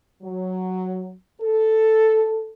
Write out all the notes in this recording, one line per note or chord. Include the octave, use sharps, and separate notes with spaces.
F#3
A4